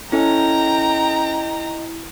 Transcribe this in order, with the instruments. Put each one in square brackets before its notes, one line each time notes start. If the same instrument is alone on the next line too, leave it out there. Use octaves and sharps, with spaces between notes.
[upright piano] C#4 A4 G#5 [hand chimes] E4 [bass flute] D#5 [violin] G5 A#5